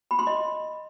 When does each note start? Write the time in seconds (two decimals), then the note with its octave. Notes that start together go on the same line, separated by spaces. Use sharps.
0.11 B5
0.19 C6
0.27 D#5